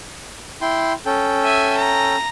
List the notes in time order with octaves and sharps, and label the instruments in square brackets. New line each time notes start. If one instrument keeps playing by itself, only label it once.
[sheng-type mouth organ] E4 G5 C6
C#4 A4 G5
[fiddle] E5 G#5
A#5